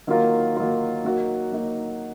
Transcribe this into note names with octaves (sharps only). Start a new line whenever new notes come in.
D#3 F#3 A#3 F4 A#4
D#3 F#3 A#3 F4 A#4
F#3 A#3 D#4 F#4
F#3 A#3 D#4 F#4